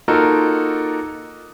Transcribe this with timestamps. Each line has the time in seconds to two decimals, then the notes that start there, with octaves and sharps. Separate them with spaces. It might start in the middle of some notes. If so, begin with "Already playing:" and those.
0.08 A#3 D#4 F4 F#4 A4 A#4